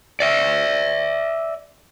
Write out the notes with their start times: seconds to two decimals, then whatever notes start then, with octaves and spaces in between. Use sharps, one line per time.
0.20 D5 E5